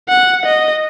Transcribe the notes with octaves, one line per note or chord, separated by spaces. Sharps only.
F#5
D#5